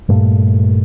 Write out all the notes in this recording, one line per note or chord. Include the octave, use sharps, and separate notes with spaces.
G2 A#2 A3